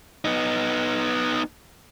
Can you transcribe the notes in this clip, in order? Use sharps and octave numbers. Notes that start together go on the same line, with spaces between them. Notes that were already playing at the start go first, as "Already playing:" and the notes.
B3 D#4